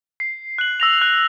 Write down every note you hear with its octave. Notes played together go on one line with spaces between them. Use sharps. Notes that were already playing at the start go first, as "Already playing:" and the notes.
C7
F#6 F#7
E6 A#6 F7
F#6